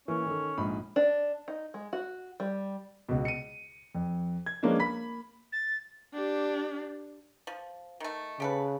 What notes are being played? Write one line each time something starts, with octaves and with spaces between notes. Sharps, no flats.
E3 A#3 C#4
D#3 A4
A#1 G#2 B5
D4
D#4
G#3
F#4
G3
C#2 B2
C#7 D#7
F2
G#6
F3 G#3 A#3 B3 C#4 D4
A#3 B5 B6
A6
D4 G4
F3
D#3 A3
C#3 G4 A4 B4